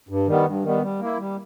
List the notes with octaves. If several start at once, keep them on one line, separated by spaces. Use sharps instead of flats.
G2
D#3 G3 B3
G2
D#3 G3 B3
G3
A#3 E4
G3